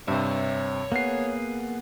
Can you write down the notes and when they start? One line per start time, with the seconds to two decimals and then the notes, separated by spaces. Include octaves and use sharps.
0.08 G2 C3 C#5 E5 C6
0.92 A#3 B3 G#4 F#5 C7